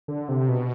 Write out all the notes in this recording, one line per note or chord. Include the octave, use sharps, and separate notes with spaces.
D3
C3
B2